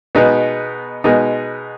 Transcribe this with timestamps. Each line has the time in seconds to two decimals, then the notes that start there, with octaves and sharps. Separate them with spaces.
0.15 B2 G#3 B3 D#4
1.04 B2 G#3 B3 D#4